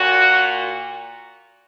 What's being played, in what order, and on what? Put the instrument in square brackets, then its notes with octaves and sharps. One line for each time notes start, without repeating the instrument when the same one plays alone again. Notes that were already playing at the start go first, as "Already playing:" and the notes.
Already playing: [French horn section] A#2 F#4